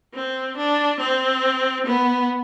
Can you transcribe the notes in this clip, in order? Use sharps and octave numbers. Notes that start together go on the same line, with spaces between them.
C4
D4
C4
B3